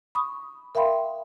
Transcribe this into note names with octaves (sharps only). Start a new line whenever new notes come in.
B5 C#6 D#6
A#4 E5 F5 G5 B5 C6